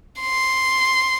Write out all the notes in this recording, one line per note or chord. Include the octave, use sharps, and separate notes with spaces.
C6